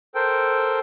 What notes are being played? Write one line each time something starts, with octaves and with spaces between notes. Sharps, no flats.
A4 A#4 C5 G5